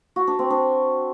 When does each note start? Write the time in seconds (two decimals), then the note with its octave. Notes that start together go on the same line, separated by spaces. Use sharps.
0.16 F#4
0.27 D4
0.39 C4
0.50 D4